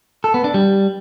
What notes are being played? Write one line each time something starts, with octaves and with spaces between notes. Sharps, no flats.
A4
B3
D4
G3